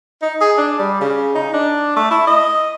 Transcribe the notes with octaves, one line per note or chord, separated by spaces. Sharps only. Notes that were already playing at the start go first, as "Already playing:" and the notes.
D#4
G#4
D4
G3
C#3
D#4
D4
A3
E4
D#5